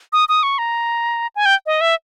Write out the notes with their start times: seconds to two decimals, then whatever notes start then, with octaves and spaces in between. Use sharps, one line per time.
0.13 D#6
0.29 D#6
0.43 C#6
0.58 A#5
1.36 G#5
1.46 G5
1.66 D#5
1.81 E5